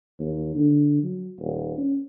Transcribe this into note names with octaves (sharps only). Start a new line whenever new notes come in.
D#2
D3
F#3
D#1
C#4